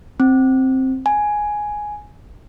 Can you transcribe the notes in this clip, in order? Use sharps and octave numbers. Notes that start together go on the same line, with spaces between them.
C4
G#5